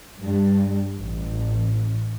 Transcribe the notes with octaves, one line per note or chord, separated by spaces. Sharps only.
G2
A1